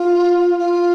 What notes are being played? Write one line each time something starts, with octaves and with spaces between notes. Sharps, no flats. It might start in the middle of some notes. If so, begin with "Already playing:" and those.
Already playing: F4
F4